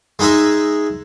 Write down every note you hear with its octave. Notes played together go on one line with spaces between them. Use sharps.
G#3 D#4 G#4 D#5 E5